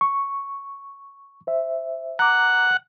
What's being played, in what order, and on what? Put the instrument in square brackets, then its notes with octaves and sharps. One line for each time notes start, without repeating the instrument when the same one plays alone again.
[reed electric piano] C#6
C5 E5
[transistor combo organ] F#5 [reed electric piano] A#5 D6